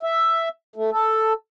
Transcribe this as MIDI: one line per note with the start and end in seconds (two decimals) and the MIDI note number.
0.03 0.49 76
0.76 0.90 57
0.92 1.33 69